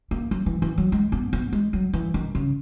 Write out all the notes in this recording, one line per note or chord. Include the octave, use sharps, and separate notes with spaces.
A#3
F#3
E3
E3
F#3
G#3
B3
B3
G#3
F#3
E3
D#3
C#3